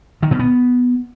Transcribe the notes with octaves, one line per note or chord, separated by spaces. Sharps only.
D#3
B2
B3